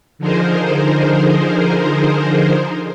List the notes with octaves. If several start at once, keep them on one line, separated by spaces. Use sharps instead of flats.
D3 F3 D#4 G#4 A#4 C5